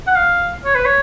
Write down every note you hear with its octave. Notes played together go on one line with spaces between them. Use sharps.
F#5
F5
C#5
B4
C#5